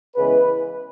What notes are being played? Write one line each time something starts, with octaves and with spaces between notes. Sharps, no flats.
C#3 E3 G#3 B3 B4